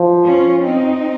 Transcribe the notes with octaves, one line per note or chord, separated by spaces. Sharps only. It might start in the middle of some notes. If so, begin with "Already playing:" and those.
Already playing: F3
C#4 F4
C4 D#4